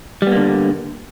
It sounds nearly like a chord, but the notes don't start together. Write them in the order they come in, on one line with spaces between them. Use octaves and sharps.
G3 B3 A#3 D3